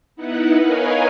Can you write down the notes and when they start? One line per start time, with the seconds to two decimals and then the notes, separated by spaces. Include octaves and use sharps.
0.16 B3 D#4 E4 B4 F#5
0.60 A#4 B4 C#5 D#5 F5 G#5